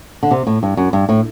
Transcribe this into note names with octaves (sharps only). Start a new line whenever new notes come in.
D3
C3
A2
G2
F#2
G2
A2